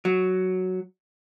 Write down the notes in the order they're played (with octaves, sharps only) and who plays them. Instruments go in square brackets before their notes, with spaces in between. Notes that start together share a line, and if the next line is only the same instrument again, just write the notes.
[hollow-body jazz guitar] F#3